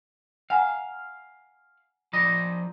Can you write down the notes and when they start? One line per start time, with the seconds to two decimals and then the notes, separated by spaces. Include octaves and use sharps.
0.50 F5 F#5 G#5 A#5
2.13 F3 D5 D#5 B5